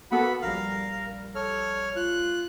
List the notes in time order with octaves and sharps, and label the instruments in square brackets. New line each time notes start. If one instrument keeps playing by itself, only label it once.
[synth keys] A#3 B3 A4 [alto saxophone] F#4 [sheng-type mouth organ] B5
[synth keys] A#1 G3 [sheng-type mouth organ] A#4 [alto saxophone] F5
[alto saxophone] A4 [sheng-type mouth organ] C#5 F6
[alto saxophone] F4 [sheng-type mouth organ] F#6